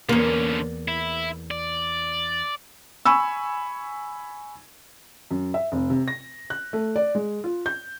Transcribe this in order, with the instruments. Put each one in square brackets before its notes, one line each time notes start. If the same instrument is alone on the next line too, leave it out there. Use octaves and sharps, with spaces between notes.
[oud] E2 A#3 [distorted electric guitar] D3 C#4
[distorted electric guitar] E4
D5
[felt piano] G#5 B5 C#6 E6
F#2
E5
F1
C3
A#6
F#6
A3
D5
G#3
F4
G6